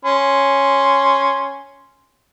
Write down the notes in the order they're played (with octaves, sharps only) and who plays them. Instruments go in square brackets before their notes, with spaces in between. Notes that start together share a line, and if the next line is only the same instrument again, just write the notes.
[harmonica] C#4 C6